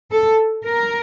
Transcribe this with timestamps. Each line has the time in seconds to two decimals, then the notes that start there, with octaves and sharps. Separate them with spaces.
0.11 A4
0.64 A#4